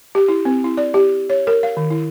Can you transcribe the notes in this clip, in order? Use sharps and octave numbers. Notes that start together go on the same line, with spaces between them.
G4
E4
C4
E4
D5
G4
C#5
A#4
F5
D#3
E4